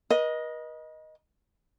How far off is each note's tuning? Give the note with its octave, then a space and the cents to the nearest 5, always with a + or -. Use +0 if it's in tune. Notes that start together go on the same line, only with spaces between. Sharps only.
B4 -45 D#5 +5